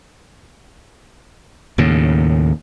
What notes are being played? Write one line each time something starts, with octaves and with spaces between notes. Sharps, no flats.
D#2 A2 C#3